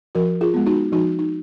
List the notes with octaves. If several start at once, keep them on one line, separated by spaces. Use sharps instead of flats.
F3 F#4 A#4
F4 G#4
G#3 B3
D#4 F#4
F3 D#4 F#4
D#4